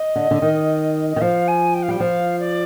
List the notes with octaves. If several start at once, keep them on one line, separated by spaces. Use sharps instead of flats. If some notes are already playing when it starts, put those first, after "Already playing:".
Already playing: D#5
D3
D3
D#3
D#5
D#3
F3 F5
G#5
G5
F5
G3 G5
F3 F5
D5